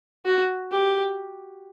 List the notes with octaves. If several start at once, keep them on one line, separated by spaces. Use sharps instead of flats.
F#4
G4